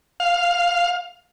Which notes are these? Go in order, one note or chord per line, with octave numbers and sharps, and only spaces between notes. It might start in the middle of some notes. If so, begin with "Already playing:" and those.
F5